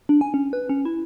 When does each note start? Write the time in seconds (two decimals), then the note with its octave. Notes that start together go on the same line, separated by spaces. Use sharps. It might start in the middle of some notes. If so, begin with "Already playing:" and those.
0.09 D4
0.21 G#5
0.34 C#4
0.53 B4
0.69 C#4
0.85 E4